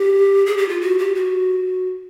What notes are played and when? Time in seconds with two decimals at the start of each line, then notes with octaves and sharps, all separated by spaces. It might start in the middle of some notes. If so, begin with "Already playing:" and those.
Already playing: G4
0.46 G#4
0.57 G4
0.69 F4
0.81 F#4
0.99 G4
1.15 F#4